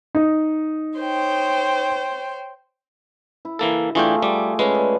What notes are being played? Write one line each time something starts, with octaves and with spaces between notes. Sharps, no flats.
D#4
C5 C#5 G5
E4
E3 A#3 A4
E3 A3 D4 F4 G#4 G5
G3 D6
G#3 C#4 B4
D5